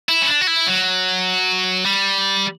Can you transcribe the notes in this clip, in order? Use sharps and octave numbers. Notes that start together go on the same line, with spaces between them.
E4
C#4
D4
F#4
E4
F#3
G3